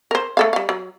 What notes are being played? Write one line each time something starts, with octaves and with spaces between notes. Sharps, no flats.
A#4 C5
A3 A4 F5
G3 F5
F#3